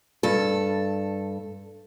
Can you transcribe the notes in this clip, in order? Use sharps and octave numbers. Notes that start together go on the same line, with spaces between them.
G2 A4